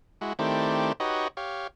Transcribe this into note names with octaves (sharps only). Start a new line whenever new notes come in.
G#3 E4 F#4
D#3 A3 C4 E4 G4 D5
D#4 F#4 G4 B4 C#5 D#5
G4 C#5 F5